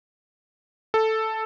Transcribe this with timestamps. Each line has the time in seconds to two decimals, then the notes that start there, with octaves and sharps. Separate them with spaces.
0.94 A4